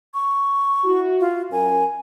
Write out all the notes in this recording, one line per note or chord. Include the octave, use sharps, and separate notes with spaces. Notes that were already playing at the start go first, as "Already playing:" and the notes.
C#6
E4 F#4
F4
F#2 A#4 G#5